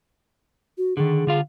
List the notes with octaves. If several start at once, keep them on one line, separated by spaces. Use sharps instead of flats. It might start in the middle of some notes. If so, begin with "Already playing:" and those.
F#4
D3 D#3 G#4
D3 F4 F5